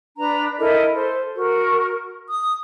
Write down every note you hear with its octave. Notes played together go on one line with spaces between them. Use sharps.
D4 B4 A#5
E4 A4 A#4 D#5
A4 C5
F#4 A#4
D#6